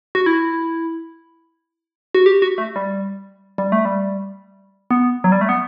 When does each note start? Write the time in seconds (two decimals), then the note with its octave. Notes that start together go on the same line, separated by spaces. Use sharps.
0.15 F#4
0.26 E4
2.15 F#4
2.26 G4
2.42 F#4
2.58 A3
2.76 G3
3.58 G3
3.72 A3
3.85 G3
4.91 B3
5.24 F#3
5.32 G3
5.41 A3
5.49 B3